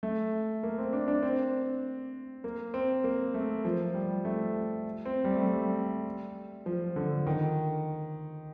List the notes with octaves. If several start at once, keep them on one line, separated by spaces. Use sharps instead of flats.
A3
A#3
C4
D4
D4
C4
A#3
C4
A#3
A3
F3
G3
A3
C4
G3
A3
G3
F3
D3
D#3